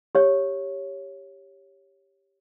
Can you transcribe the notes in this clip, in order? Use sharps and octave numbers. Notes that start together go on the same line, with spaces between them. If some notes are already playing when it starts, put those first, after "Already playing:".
G4 C#5